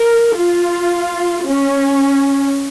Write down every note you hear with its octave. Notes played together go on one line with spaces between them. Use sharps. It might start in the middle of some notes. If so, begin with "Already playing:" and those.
Already playing: A#4
F4
C#4